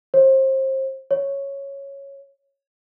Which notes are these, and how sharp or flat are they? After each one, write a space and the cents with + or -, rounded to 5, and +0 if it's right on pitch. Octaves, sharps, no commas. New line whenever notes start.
C5 +30
C#5 -5